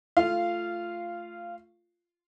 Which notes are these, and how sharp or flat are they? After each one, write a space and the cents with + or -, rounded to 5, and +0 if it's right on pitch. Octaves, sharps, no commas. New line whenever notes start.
A3 +0 F4 -10 F5 -15